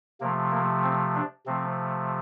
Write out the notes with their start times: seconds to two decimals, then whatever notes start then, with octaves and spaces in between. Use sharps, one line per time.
0.20 C3 F3 A3 A#3
0.51 A#3
0.84 C4
1.15 D4
1.46 C3 F3 A3 C4